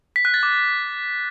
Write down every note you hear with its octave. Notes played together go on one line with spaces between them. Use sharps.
B6
F#6
A6
D6